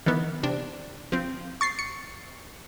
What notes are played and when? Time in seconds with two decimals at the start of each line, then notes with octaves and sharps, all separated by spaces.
0.06 D#3 E3 B3
0.43 C3 D4
1.12 F3 C4
1.61 C#6 A6 C7
1.79 C#7